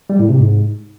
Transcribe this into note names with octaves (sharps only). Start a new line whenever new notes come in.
G3
A2
C3
G#2